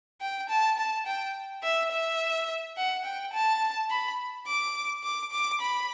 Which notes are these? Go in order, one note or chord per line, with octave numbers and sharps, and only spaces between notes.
G5
A5
A5
G5
E5
E5
F#5
G5
A5
B5
D6
D6
D6
B5